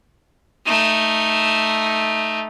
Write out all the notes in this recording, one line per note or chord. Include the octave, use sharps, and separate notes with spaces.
A3 D#4